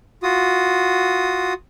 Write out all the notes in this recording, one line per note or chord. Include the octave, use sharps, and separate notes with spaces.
F4 F#4 D#6